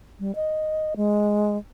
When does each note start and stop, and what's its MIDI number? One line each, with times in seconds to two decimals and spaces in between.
0.20 0.34 55
0.35 0.94 75
0.96 1.57 56